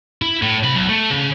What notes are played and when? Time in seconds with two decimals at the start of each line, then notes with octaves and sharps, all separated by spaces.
0.22 E4
0.43 A2
0.64 C3 B5
0.76 B1
0.89 A3
1.11 C#3